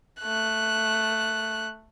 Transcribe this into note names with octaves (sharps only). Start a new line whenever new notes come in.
A3 F#6